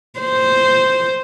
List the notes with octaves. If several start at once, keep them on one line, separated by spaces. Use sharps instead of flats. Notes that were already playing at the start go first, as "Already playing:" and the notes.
C5